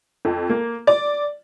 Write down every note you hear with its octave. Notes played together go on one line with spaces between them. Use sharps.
F2
A#3
D5